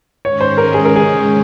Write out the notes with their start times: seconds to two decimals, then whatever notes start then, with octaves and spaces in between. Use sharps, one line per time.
0.25 G#2 D#3 G#3 C#4 C#5
0.40 C5
0.58 A#4
0.74 G#4
0.85 A#4
0.96 G#4